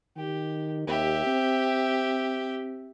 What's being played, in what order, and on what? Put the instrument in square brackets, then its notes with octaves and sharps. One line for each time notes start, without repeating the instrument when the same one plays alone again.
[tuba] D#3 [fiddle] G4
[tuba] D#2 [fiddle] G4 E5
[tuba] C4